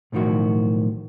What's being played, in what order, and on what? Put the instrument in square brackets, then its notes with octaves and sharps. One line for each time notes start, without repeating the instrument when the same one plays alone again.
[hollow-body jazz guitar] B1 A2 D#3 F3 F#4